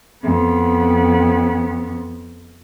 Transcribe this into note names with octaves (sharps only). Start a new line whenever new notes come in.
F2 B3